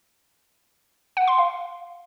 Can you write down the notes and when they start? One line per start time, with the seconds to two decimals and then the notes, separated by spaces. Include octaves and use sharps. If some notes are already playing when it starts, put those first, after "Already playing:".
1.17 F#5
1.28 C6
1.38 F5